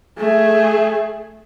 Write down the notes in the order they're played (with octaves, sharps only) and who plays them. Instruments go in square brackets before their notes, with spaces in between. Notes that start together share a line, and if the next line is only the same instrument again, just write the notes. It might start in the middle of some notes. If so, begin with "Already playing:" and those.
[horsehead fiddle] A3 G#4